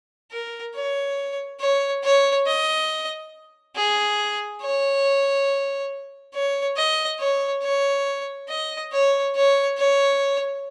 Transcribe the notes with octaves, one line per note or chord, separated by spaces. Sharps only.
A#4
C#5
C#5
C#5
D#5
G#4
C#5
C#5
D#5
C#5
C#5
D#5
C#5
C#5
C#5